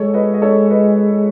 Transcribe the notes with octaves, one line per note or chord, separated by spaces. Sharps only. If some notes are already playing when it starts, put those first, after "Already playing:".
Already playing: G#3 A4 C#5
B4 D#5
D#5
A4 C#5
B4 D#5